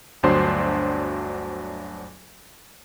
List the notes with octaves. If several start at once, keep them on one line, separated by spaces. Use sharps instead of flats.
G1 D2 F#3 D4 C5 C6